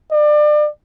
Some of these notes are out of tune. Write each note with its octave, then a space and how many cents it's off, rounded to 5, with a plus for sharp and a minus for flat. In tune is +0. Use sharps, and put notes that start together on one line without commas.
D5 +30